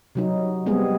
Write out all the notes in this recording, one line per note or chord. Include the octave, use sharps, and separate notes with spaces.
C3 F#3 D#4
G3 G#3 B3 C4 G#4